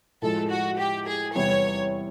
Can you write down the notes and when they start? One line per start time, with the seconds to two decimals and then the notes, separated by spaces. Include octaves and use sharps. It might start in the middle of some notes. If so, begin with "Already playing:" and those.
0.22 A2 F3 G#3 A4
0.50 F#4
0.78 G4
1.07 G#4
1.35 E2 C3 E3 G3 B3 C#5